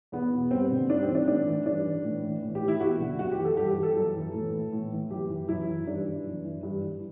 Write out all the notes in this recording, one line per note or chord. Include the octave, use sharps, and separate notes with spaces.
E2 B3
B2
G2 C4
D3
G2 D4
C4
E3
D4
A2 D4
E3
G2 D4
E3
A2
E3
A2
G4
E3
E4
G4
E2 F#4
D3
F#2 F#4
G4
E3
A4
G2 G4
G4
E3
A4
F#2
E3
A2
E3
A2
E3
F#2 G4
E3
F#2 E4
E3
G2 D4
E3
F#2
E3
G2
E3